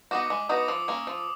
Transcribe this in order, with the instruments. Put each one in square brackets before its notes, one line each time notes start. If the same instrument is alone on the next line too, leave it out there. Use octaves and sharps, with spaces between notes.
[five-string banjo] B3 D#4 F#4 [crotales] D6
[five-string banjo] G#3 [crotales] D6
[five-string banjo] B3 D#4 F#4 [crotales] D#6
[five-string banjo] F3 [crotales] E6
[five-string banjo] A#3 C#4
F3